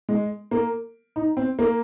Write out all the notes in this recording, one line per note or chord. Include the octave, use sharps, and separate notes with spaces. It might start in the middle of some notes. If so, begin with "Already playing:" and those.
G#3
A#3
D#4
C4
A#3